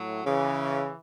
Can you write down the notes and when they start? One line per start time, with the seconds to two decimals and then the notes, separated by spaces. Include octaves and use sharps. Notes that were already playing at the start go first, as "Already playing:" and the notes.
Already playing: A2 F#3
0.25 C#3 E3